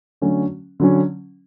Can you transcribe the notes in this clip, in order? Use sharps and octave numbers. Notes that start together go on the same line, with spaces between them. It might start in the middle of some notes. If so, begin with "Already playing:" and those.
D3 F#3 A3 C#4 F#4
D3 F#3 C#4